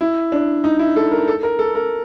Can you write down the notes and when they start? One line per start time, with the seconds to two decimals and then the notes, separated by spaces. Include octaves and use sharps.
0.01 E4
0.32 D4
0.64 D#4
0.79 E4
0.96 A4
1.11 A#4
1.28 A4
1.43 A#4
1.59 A4
1.75 A#4